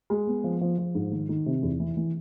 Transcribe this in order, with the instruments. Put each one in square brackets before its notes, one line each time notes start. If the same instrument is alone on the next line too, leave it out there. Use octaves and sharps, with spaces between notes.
[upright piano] G#3
B3
F3
F3
F3
G#2
D#3
D#3
C3
E2
E3
E3